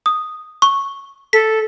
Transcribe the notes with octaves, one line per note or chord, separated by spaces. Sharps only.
D#6
C#6
A4 B6